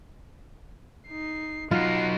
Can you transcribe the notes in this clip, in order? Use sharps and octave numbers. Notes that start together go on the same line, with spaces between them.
D#4 C7
F#3 D#4 F4 F#5 C7